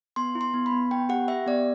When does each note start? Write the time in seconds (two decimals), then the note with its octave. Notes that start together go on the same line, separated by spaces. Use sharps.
0.16 B3 C6
0.35 E4
0.41 C6
0.54 B3
0.66 B5
0.72 B3
0.91 B3 G5
1.09 G4 F#5
1.28 G4 E5
1.47 B3 D5